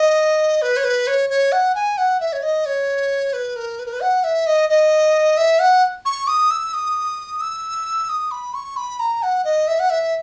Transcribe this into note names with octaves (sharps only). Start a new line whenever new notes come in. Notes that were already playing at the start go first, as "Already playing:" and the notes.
Already playing: D#5
B4
C#5
B4
C#5
C#5
F#5
G#5
F#5
E5
C#5
D#5
C#5
B4
A#4
B4
A#4
B4
F#5
E5
D#5
D#5
E5
F#5
C#6
D#6
E6
D#6
E6
D#6
B5
C#6
B5
A#5
F#5
D#5
E5
F#5
E5